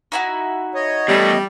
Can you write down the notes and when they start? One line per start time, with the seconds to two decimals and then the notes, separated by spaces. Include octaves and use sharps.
0.12 D#4 E4 F#4
0.74 C#5 D#5
1.08 E2 G3 A3